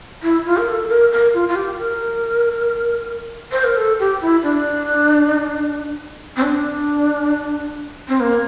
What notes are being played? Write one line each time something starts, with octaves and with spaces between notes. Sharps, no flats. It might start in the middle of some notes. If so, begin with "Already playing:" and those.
E4
F4
A#4
A4
A#4
A#4
F4
F4
G4
A#4
C5
A#4
A4
G4
E4
D4
C4
D4
C4
A#3